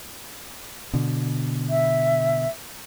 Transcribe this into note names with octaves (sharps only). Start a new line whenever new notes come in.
B2 D3
E5